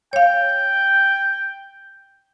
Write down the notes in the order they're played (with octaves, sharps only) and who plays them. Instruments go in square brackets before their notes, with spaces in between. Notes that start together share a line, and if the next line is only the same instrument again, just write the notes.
[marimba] C#5 F5 [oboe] G5